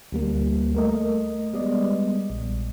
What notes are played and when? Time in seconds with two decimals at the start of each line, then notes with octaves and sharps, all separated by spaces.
0.12 D2 G3 A#3
0.75 A3 A#4 D#5
1.53 G3 G#3 B3 D5 D#5
2.30 A#1